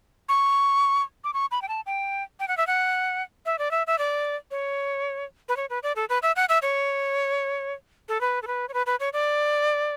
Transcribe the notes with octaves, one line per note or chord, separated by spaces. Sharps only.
C#6
D6
C#6
B5
G5
A5
G5
G5
F#5
E5
F#5
E5
D5
E5
E5
D5
C#5
B4
C#5
B4
D5
A4
B4
E5
F#5
E5
C#5
A4
B4
A4
B4
C#5
B4
B4
C#5
D5